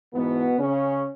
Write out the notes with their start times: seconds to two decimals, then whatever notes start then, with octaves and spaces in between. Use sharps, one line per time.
0.13 G#2 B2 E3 B3
0.59 C#3 C#4